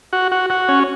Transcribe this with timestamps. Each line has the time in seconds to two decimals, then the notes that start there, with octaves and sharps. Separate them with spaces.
0.13 F#4
0.32 F#4
0.50 F#4
0.69 C#4